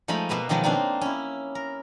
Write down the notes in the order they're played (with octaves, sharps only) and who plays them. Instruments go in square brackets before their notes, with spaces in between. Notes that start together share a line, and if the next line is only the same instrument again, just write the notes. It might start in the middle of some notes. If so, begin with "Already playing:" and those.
[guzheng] F3 G#3 A3 D#4 B5
B2 A#3 B4 E5
B2 D#3 F3 F#3 G#3
A#3 C4 D4 D#4
C#4 E4
A#4